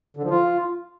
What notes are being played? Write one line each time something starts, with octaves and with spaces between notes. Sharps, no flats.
D3
F3
F4